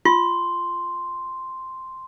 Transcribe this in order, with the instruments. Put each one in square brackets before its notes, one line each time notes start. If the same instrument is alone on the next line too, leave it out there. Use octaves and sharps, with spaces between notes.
[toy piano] F4 [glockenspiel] C6